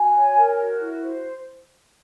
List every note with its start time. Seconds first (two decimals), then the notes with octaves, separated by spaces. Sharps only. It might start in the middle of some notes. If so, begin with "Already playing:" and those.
Already playing: F#4 G#5
0.15 C#5
0.37 A#4
0.59 F#4
0.80 E4
1.03 C5